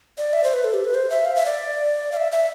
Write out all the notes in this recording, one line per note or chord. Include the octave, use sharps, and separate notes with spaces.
D5
E5
C5
B4
A4
G4
B4
C5
E5
F5
E5
D5
F5
E5
E5